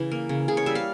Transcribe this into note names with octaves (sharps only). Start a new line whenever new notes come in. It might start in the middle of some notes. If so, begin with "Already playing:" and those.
Already playing: C#3 E3
A#3
C#3
C#3 G#4
C#5
G3 E5
F5